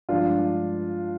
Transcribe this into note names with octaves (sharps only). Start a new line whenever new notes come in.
G2 F3 G#3 D4 F4